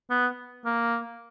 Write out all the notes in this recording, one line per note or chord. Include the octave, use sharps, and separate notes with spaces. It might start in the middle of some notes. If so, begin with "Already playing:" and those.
B3
A#3